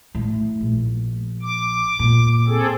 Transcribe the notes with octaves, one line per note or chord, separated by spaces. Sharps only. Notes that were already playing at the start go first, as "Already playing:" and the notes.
A2
A#1
D6
A#2
C4 G#4 A4